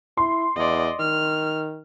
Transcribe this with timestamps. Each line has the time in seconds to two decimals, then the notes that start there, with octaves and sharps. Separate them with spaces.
0.17 E4 C6
0.56 E2 D5 D#5
1.00 D#3 F6